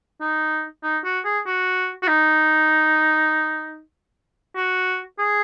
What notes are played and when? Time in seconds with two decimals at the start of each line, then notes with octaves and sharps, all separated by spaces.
0.21 D#4
0.83 D#4
1.05 F#4
1.25 G#4
1.46 F#4
2.03 F#4
2.07 D#4
4.56 F#4
5.19 G#4